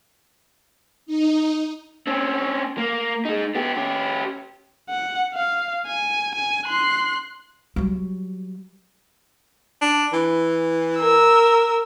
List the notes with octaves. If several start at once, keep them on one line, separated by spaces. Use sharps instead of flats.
D#4
C4 C#4
A#3
G#3 D#4
B3 G4
C#4 G4
F#5
F5
G#5
G#5
C6 F#6
F#3 G3
D4
E3
A#4 E6